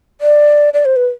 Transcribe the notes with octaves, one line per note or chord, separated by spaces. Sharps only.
D5
D5
C5
B4